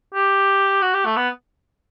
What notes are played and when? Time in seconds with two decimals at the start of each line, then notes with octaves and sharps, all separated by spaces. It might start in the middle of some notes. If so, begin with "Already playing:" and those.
0.14 G4
0.82 F#4
0.94 G4
1.05 A3
1.17 B3